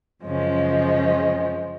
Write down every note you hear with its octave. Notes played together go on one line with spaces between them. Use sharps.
F#2 C#3 F3 G#3 C#4